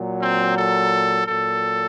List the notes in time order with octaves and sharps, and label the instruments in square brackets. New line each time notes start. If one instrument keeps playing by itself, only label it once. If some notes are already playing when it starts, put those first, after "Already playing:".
Already playing: [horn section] A#2 F#3
C4
A4
A#2 F#3 A4